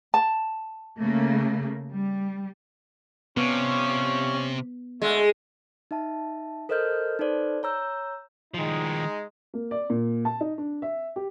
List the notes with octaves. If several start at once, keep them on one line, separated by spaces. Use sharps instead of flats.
A5
C#3 A3 A#3
G3
C3 F3 G3 B3 C#4
B2 D3 G#3 A3
D#4 E5 A5
A4 A#4 C5 D#5 F6 G6
D#4 A4 B4 C5 D5
C#5 A#5 E6 G6
D#3 F3 G#3 D#4
A#3
D5
A#2
A5
D#4
D4
E5
G4